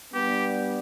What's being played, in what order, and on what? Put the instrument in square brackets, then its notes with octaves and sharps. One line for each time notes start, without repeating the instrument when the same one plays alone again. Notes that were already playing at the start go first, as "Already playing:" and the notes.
[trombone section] G3 B3 D4 [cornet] G4